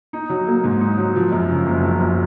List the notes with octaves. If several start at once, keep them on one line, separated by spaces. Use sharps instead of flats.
D#4
F#3
A#3
G#2
D#4
F#3
F3
F#2
C#3
F#1
F3
F#2